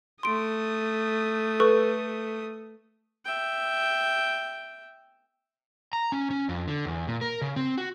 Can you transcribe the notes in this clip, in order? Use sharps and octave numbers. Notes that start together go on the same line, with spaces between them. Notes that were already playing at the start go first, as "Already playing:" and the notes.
A3 C6 D#6 D7
A4 B4 C#6
E5 G5
A#5
C#4
C#4
F2
D3
E2
A#2
A#4
C#3
C4
F#4